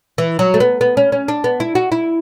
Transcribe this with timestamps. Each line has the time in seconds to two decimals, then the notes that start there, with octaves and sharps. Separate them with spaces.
0.18 E3
0.39 F#3
0.54 A3
0.60 B3
0.81 B3
0.97 C#4
1.12 C#4
1.28 D4
1.44 B3
1.60 E4
1.75 F#4
1.92 E4